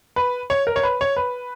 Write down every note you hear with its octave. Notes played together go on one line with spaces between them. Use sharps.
B4
C#5
A#4
C#5
B4
C#5
B4